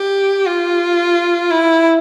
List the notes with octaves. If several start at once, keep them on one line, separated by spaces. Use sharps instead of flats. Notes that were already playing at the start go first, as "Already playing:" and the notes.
Already playing: G4
F4
E4